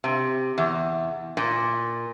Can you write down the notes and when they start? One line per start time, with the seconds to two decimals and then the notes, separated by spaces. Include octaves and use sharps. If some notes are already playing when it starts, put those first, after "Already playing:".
0.04 C3
0.58 E2
1.37 A#2